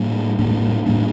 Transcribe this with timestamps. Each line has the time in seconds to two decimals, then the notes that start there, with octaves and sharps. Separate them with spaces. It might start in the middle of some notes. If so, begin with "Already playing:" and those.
Already playing: A2 G3 A#3 D4
0.38 A2 G3 A#3 D4
0.86 A2 G3 A#3 D4